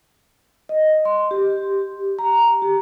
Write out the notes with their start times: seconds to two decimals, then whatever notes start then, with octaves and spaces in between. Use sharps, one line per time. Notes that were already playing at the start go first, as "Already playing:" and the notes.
0.69 D#5
1.05 C6
1.31 G4
2.19 A#5
2.62 G4